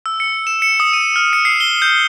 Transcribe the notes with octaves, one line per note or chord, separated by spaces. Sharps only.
E6
C#7
E7
C#7
D#6
D#7
F6
C#7
C7
G7
G6